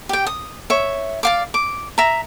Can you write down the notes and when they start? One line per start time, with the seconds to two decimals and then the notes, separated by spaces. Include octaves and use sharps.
0.09 G4 G5
0.27 D#6
0.70 C#5 E5
1.23 D5 F5 D6
1.54 D6
1.98 E5 A#5